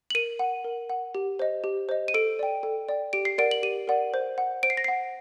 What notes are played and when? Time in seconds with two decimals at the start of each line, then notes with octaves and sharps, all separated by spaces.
0.10 F#7
0.15 A#4 D#7
0.39 F#5
0.64 A#4
0.90 F#5
1.15 G4
1.39 C5 D#5
1.64 G4
1.89 C5 D#5
2.08 D#7
2.14 A4 D7
2.39 D5 G5
2.63 A4
2.89 D5 G5
3.13 G4 D7
3.25 C7
3.38 A#4 D5 F#5 D7
3.51 F#7
3.63 G4 D#7
3.88 A#4 D5 F#5
4.14 C5
4.38 F#5
4.63 C5 D7
4.70 C7
4.77 A#6
4.84 F#5 C7